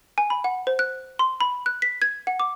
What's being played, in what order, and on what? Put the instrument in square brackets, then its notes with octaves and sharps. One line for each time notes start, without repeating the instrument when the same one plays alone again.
[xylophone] G#5
B5
F#5
C5
F#6
C6
B5
F#6
B6
G#6
F#5
D6